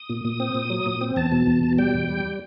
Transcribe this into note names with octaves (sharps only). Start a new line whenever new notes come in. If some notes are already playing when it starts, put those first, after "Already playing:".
Already playing: D#6
A#2
A#2
C4
A#2
F#3
A#2
C4
E2 A5
B2
E2
B2
G3 G5
E2
G3